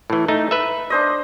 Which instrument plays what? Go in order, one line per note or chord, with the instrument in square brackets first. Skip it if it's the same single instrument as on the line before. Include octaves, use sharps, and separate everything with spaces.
[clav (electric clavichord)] A2 E3
A3 D#4
B4 E5
[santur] D4 C5 D#5